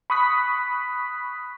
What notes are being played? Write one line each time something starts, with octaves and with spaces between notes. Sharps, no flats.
B5 C#6 D#6 F#6 B6